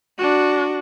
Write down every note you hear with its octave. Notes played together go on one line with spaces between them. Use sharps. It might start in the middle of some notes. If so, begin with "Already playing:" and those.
D4 F#4